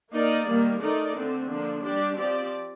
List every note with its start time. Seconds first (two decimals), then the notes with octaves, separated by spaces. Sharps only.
0.12 A#3 D#4 A#4 D5
0.46 D#3 G3 A#3
0.80 A3 D#4 A#4 D5
1.15 D3 A3 C4
1.49 D3 F3 A#3 D4
1.83 G3 D4 G4 D5
2.18 F3 C4 G4 D5